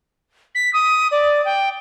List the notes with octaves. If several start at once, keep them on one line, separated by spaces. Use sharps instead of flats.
B6
D#6
D5
G5